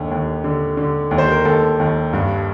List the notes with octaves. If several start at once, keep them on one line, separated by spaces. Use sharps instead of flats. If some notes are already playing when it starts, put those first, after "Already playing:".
Already playing: D#2 D3
D#2
D3
D3
D#2
C5
A#4
D#2 A4
D#2
G2